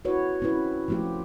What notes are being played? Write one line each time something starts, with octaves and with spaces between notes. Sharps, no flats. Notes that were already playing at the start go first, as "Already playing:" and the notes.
E4 F#4 B4 C#5
C4 C#4 E4 B4
F3 A3 C4 F4 G4